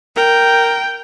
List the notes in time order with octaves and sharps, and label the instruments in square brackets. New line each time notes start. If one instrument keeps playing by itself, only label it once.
[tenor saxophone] A#4 [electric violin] G5